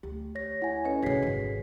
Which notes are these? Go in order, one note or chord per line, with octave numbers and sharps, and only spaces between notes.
D2 G4
C#5 A#6
E4 F#5 G#5
C#4 A4 B4 C#5 D#5
F2 C#3 F#4 G#4 B6 C7
G#1 D#3